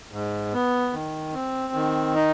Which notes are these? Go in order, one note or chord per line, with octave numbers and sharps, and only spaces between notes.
G#2
B3
D#3
C4
D#3
D#4